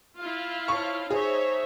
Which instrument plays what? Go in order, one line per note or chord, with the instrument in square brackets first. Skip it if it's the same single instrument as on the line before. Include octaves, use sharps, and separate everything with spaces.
[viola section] E4 F4 F5
[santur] C#5 A5 B5 [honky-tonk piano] C#6
[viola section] D#4 C#5 E5 [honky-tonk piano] G#4 [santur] C5